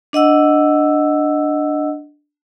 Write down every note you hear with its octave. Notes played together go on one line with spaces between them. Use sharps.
D4 D#5 F#5 E6